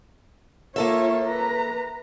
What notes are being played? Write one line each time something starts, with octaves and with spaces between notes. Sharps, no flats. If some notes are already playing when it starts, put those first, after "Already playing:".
A#3 F4 A4 C#5 E5
B4 A#5